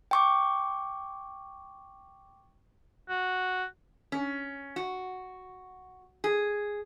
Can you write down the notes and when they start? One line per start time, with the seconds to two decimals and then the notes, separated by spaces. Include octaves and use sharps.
0.11 G5 C#6 D6
3.09 F#4
4.12 C#4
4.76 F#4
6.24 G#4